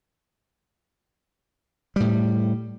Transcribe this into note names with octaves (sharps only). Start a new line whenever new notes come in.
A2 G3